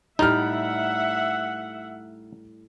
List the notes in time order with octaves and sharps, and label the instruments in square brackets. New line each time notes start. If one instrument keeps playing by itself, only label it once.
[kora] A2 G3 G5 [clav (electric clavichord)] D#4 [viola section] E5 F#5 [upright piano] A#5 F6